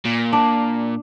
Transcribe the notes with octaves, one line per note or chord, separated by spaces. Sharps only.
A#2
D4